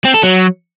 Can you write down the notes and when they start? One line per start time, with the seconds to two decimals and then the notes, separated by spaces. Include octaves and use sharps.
0.05 C4
0.14 A4
0.23 F#3